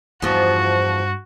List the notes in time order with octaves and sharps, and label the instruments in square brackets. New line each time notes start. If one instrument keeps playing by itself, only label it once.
[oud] E2 F3 [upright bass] G2 [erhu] F#4